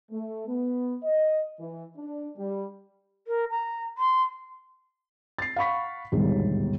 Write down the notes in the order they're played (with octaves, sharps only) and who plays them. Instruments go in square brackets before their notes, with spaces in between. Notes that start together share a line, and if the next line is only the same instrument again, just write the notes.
[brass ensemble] A3
B3
D#5
E3
D4
G3
[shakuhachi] A#4
A#5
C6
[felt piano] A6 C7
F5 F#5 B5 C#6 B6
G1 D#2 G#2 B2 G3